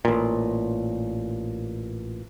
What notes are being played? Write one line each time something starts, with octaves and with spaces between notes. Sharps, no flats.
A1 A#2